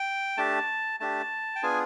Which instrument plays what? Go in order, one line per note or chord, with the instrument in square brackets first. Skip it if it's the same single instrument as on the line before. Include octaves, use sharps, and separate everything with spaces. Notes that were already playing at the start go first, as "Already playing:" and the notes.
Already playing: [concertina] G5
A3 D4 G4 A5
A3 D4 G4 A5
G5
B3 D4 F4 G#4 G#5